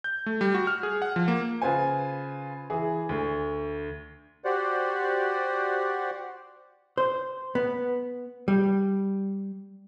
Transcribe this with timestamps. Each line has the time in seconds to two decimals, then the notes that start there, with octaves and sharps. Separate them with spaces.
0.04 G6
0.26 A3
0.41 G3
0.55 F#4
0.67 F6
0.83 G#4
1.02 F#5
1.16 F3
1.28 A#3
1.62 C#3 F4 B4 C5 G#5
2.70 E3 G#4
3.09 D2
4.44 F#4 G4 C5 D5 F#5
6.98 C5
7.55 B3
8.48 G3